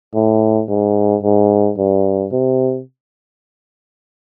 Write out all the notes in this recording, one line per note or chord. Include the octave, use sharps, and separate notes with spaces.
A2
G#2
G#2
G2
C3